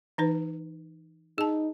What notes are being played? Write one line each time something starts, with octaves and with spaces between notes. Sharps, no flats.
E3 D#4 B4
D#4 G#4 A5